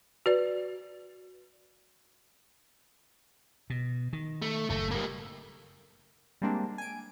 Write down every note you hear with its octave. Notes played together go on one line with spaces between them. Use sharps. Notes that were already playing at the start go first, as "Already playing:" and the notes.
F#4 B4 D5
B2
D#3
A3
F#1 A2 A3
G3 A#3
G3 G#3 A#3 C4 D4
G#5 D7